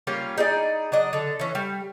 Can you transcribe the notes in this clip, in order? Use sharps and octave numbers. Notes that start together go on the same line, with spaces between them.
G3 A#3 C#4 F4
D#4 E4 G#4 D5
F#3 D4 D#5
D3 A4
E3 C#4
G3